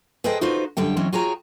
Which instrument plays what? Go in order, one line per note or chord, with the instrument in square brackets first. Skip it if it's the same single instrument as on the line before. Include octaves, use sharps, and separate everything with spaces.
[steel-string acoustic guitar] G#4 A4 B4 C5 D#5 G5
D#4 F4 F#4 B4 C5
F#2 D3 G3 G5
E3 F#3 G#3 C4 C#4
F4 F#4 G#4 C#5 G5 A#5